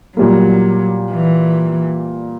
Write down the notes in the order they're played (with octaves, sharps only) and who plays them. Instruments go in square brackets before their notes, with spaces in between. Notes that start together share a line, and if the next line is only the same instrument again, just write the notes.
[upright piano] A#2 G3 A#3 [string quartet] F#3
[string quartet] E3